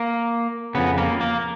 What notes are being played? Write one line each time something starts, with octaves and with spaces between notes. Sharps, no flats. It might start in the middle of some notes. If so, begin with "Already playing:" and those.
Already playing: A#3
F2 C#3 B3
A#3
A#3